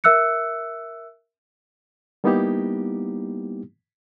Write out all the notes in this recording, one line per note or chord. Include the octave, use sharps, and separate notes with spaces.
A#4 E5 E6 F#6 C#7
G3 A#3 B3 D#4 E4 G4